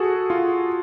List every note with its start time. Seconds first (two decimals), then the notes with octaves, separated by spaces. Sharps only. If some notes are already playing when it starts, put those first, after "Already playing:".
Already playing: F#4 G#4 A4
0.30 F4